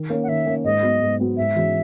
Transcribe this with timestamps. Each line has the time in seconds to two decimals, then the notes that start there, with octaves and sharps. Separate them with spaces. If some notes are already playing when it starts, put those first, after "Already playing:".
Already playing: D#3
0.10 A#3 C#4
0.23 F#5
0.28 D#3 E5
0.46 A#3 C#4
0.64 G#2 D#5
0.83 F#3 B3 F#4
1.01 G#2
1.19 F#3 B3 F#4
1.37 G#2 E5
1.55 E3 G#3 C#4 F#4